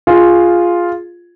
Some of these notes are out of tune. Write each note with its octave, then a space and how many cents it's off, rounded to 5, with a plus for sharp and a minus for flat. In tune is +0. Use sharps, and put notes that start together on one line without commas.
F4 +0 G#4 +0